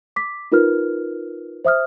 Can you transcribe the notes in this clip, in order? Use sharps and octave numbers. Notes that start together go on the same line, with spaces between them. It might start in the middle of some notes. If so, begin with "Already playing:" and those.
D6 B6
D#4 F4 A#4 B4 F6
C5 E5 D#6 F6